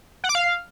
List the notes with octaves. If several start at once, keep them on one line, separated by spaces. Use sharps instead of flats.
F#5
D6
F5